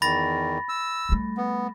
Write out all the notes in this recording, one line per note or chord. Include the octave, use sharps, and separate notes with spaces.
E2 D#3 B5 A6 A#6
E6
G3 A3
B3